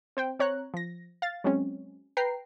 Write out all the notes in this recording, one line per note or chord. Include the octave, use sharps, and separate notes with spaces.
C4 C5 G5
C4 C#5 A#5 F#6
F3 A#6
F5 A6
F#3 G#3 C4 C#4
B4 G5 A#5 C7